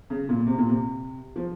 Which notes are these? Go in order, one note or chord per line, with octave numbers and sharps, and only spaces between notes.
C#3
A#2
C3
A#2
C3
F3